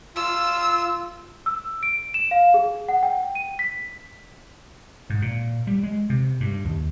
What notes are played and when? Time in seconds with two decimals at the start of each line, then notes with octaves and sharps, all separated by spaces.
0.16 F4 E6
1.46 E6
1.83 D7
2.14 E7
2.31 F5
2.54 G#4
2.89 F#5
3.03 G5
3.35 D#7
3.59 B6
5.10 G#2
5.22 A#2
5.67 G3
5.83 G#3
6.10 C3
6.40 G2
6.65 D#2